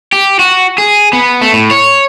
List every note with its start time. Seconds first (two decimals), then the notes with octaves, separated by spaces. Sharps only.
0.13 G4
0.39 F#4
0.78 G#4
1.13 B3
1.41 A3
1.53 A2
1.71 C#5